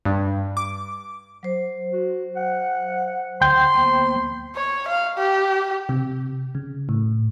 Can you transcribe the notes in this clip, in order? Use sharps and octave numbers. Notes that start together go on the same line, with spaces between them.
G2
D6
F#3 C5
F#4
F#5
D2 G5 C6 G6
A#3 B3 C5
C#5
F5
G4
C3
C#3
A2